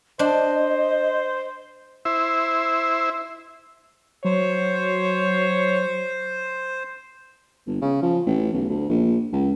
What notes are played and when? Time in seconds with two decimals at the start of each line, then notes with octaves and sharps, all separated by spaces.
0.19 D4 C5 D#5
2.05 E4 C5 E5
4.25 F#3 C5 C#5
7.67 G1
7.81 C#3
8.03 F3
8.27 A1
8.53 B1
8.69 D2
8.90 A#1
9.33 C#2